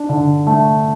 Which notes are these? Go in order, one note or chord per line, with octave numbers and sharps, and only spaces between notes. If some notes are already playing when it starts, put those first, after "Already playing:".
Already playing: D4
D3
A3